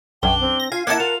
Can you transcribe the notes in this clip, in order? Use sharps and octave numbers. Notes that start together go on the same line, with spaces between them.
B1 F#2 D4 G5 G7
C4
A#6
F4 F5 G#5
A#3 D#4 E4 A#4 F#5 A5 G#6
F4 F7